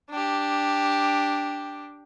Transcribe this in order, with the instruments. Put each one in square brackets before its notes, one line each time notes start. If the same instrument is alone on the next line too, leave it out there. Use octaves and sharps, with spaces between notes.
[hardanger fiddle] D4 G4